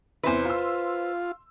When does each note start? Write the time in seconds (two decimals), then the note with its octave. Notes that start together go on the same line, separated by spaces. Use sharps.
0.23 E2 C3 E4 B4 C5
0.45 F4 C6 E6